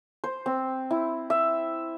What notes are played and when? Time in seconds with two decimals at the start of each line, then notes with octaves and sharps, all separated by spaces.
0.24 C5
0.46 C4
0.91 E4
1.30 E5